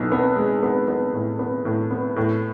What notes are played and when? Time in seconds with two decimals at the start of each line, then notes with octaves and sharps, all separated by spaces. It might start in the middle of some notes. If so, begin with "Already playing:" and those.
Already playing: B1 A2 B3
0.12 B3
0.36 G#3
0.63 B3
0.88 B3
1.14 A2
1.39 B3
1.65 A2
1.91 B3
2.16 A2